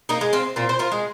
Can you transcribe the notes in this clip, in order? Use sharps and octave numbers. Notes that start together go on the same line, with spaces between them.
A#3 D#4
G#3
C4 F4
A#2 C4 F4
C5
F4 A#4
G#3